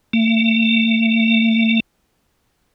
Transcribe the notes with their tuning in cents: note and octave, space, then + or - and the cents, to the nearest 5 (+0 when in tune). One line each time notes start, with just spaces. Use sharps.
A3 +40